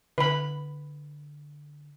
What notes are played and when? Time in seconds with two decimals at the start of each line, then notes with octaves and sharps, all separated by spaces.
0.18 D3 B4 B5